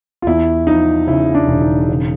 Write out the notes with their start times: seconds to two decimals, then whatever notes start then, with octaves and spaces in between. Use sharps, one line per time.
0.22 F4
0.27 E2 E4
0.67 F3 D#4
1.07 C#3 E4
1.35 D4
1.48 E1
1.61 D#4
1.88 C#3